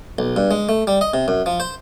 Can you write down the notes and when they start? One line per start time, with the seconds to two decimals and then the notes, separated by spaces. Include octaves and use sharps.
0.19 B1
0.36 G2
0.51 G#3
0.69 A3
0.87 G3
1.01 D#5
1.14 C3
1.28 F#2
1.46 F3
1.60 C5